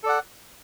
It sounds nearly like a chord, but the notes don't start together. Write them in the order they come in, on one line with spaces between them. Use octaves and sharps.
A4 D5 F#5